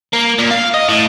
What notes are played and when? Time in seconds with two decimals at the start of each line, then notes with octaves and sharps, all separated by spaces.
0.14 A#3
0.39 A#2
0.51 F5
0.74 D#5
0.89 A2